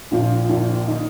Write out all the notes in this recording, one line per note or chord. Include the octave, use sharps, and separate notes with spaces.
A#1 A#2 F3 F4
A#1 A#2 F3
D#3 D#4